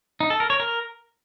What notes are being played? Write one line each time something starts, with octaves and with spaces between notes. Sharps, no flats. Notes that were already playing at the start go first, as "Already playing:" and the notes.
D#4
A4
A#4
C#5
A#4